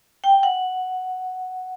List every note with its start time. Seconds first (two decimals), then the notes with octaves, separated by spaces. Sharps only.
0.24 G5
0.43 F#5